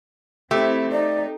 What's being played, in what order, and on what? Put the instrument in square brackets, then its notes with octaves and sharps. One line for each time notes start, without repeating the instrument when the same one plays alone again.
[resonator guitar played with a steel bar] A3 [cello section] C4 E4 [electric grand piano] G4
[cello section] D#4 [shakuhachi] D5